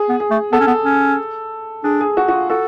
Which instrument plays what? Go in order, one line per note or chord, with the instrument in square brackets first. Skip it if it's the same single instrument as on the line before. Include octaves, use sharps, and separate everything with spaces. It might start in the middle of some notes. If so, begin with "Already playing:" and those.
Already playing: [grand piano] G#4
[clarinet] B3
[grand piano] G#4
[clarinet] A3
[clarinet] B3 [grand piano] A4
[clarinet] C#4
B3
C#4
[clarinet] D4 [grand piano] G#4
[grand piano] G#4
F#4
F#4
F4
[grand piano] F#4 [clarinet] A4